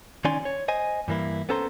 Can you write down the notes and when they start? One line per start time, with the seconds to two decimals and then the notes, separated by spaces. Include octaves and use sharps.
0.25 D#3 C#4 D#4 D5 G#5 C6
0.45 C#5
0.68 C5 D#5 G#5
1.08 G2 E3 A#3 E4
1.49 B3 C#4 A4 C5 A#5 C6